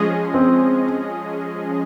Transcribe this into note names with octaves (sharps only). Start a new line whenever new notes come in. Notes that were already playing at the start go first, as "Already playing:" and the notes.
Already playing: F3 G#3 C#4 G#4 D#5
C4